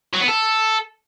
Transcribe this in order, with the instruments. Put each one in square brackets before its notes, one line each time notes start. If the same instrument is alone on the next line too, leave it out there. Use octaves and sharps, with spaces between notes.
[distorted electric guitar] F#3
B3
A4